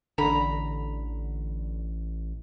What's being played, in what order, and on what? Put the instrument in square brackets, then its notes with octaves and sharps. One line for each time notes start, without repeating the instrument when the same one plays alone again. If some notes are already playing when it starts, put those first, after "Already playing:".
[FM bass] A1 [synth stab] D3 [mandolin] A#5 B5